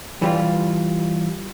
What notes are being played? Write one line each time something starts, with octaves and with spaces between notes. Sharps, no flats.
E3 G3 F4